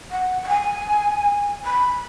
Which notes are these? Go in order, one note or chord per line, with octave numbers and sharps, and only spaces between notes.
F#5
F#5
G#5
B5